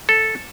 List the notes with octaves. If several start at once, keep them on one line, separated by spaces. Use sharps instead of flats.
A4